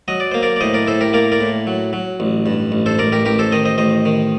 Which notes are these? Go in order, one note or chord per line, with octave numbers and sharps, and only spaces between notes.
F#3 D#5
D5
A#3 C5
A#4 D5
D5
A2 C5 D#5
A#4 D5
A2 A4 C5
G4 A#4
A#3 A#4 D5
A#4 D5
A2
F#3
F#3
A1
G2
A1
A4 C5
A1 A#4 D5
G4 A#4
A1 G4 A#4
A4 C5
D#3 C5 D#5
C5 D#5
A1 C5 D#5
D#3